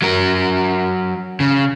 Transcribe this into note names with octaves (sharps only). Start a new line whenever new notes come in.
F#3 A#4
C#3